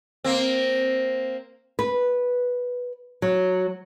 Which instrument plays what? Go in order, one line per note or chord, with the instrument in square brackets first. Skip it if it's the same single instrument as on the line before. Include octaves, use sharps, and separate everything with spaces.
[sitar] A#3 C4
[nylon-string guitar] B4
F#3